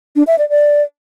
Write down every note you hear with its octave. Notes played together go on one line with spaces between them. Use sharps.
D4
E5
D5
D5